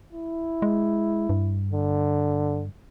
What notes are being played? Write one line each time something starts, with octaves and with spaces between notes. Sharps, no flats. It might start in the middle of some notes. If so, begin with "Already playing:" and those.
E4
G#3
G2
D3